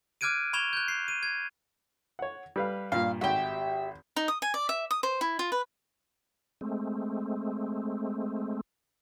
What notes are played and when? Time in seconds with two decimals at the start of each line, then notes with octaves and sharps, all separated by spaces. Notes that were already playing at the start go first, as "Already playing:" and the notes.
0.21 D6 F6 F#6 G#6 D7 D#7
0.53 B5 C#6 G#6 E7 F7 G7
0.73 F#6 G6
0.88 C7
1.08 D#7
1.23 G#6
2.19 C#5 F#5
2.56 G3 B4 F5
2.92 G2 A#2 F5
3.21 G#1 F#4 G4 E5
4.16 D#4
4.28 D#6
4.42 G#5
4.54 D5
4.69 E5
4.91 D#6
5.03 C5
5.21 E4
5.39 F4
5.52 B4
6.61 G#3 A3 C4